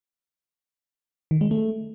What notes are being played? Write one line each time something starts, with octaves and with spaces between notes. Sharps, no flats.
D#3
G#3
A3